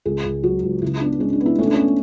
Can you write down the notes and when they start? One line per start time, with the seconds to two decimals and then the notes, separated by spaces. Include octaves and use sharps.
0.05 C#2 G#4
0.24 C#2
0.43 F#3 F#4
0.63 C#2
0.82 C#3 E4
1.01 B3 D4
1.20 G#3 C#4
1.33 D4
1.40 B3
1.46 E4
1.58 A3 C#4
1.66 D4
1.74 C#4